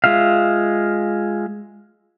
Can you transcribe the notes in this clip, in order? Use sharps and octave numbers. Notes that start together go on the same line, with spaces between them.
G#3 F4 E5 F5